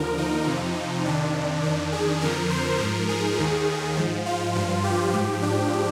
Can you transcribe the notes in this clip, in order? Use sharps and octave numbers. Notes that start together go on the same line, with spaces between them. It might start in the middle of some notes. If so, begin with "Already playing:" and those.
Already playing: D#2 D3 F3 A#4
D#4
F2 C3 F3
F2 C3 D#3 D4
F2 D#3 D4
G#4
F2 D3 F3 A#4
C5
G#2 F3 A#4
G#4
D#2 D#3
G#2 F3
F4
G2 F3
G4
G#2 F3 G4
D4